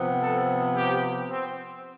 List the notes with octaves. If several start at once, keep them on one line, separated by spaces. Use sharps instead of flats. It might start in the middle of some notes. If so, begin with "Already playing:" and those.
Already playing: C3 F3 B3
A4
G4
C4